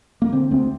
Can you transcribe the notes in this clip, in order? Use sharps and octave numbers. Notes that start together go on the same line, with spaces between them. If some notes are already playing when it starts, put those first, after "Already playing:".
A#3
D3 C4
D2 C4